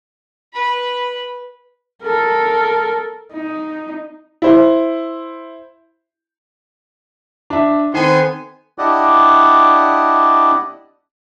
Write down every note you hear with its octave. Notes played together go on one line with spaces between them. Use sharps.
B4 B5
A4 A#4
D#4
E4 C5
D4 E5
D#3 B3 C4 A4 C5 G#5 C6
D4 E4 G4 D5 D#5 F#5